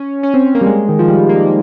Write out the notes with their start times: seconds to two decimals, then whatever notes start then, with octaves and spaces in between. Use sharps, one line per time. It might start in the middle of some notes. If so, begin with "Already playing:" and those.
Already playing: C#4
0.23 C#4
0.34 C4
0.45 C4
0.55 A#3
0.61 G3
0.66 G#3
0.89 D#3
0.99 F3
1.08 G3
1.29 A#3